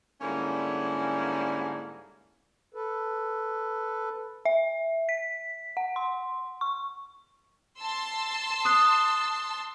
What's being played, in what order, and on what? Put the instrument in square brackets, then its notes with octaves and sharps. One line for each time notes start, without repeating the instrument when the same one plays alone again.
[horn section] G#2 D3 G3 A#3 C#4 E4
[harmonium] A4 B4
[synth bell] E5
B6
F#5
C6
C#6
[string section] A5 C6 E6
[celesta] D#6 F#6 C7